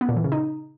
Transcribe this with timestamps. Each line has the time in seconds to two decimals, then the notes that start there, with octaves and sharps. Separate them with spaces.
0.01 B3
0.09 A#2
0.16 E3
0.24 C#3
0.32 D#4